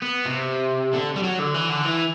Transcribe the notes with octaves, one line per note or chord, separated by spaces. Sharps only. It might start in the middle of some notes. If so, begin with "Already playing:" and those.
B3
C3
D3
G3
F#3
D3
E3
D3
E3